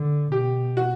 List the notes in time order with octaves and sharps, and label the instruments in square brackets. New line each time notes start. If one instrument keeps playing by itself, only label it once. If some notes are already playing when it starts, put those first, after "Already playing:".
Already playing: [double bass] D3
[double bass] B2 [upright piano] G4
[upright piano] F#4